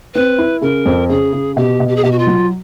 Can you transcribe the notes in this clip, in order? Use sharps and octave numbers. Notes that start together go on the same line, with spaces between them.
C4 B4
E4
C#3 A#4
F2
C#3 G#4
C#3
B2 G4
B2
G4
G#4
B2 G4
F#4
F4
F#3